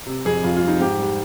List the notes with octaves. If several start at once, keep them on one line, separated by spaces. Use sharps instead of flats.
C3
F2 G#4
F2 F4
F4
G3
D#4
G#2 G4
G3